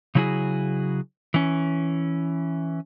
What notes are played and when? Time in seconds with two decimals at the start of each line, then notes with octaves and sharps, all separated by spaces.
0.15 C#3 F#3 E4 F#4 G#4
1.34 E3 C#4